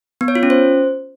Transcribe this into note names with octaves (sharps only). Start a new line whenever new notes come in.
B3
C#5
F4
C#4
C5